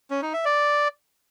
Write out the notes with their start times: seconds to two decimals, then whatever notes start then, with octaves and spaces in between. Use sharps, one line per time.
0.10 C#4
0.22 D#4
0.34 E5
0.45 D5